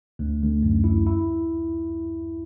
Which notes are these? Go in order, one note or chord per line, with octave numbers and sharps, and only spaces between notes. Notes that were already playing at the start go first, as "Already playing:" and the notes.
D2
D2
F#2
E4
E4